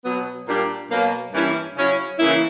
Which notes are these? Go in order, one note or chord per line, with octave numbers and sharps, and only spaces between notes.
B2 F#3 B3
A#2 G3 A#3 D4
B2 F#3 A#3
G2 E3 A#3 C#4 E4
C#3 F#3 C#4 E4
C#3 E3 A#3 E4